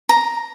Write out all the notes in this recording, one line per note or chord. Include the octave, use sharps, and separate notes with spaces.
A#5